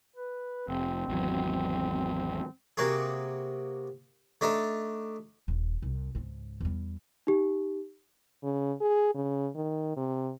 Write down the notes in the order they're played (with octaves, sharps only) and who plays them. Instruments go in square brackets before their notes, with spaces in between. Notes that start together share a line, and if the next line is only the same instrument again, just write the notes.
[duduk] B4
[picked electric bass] F1 [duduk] C4
[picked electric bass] G#1 E2 F#3
[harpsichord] C3 A#3 F#4 G#4
A3 D4 D#4 A4
[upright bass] D#1
C2
C#2 G#2
E2 G3
[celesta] D#4 G4
[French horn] C#3
G#4
C#3
D#3
C3